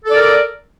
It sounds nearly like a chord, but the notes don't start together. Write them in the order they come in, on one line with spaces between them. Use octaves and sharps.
A4 D5 A#4